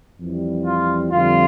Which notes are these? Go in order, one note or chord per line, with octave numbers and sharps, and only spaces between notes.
F2 E3 G3
F4
F2 D3 G3 F4